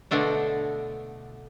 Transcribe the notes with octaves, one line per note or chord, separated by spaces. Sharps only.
B2 D3 A3 D4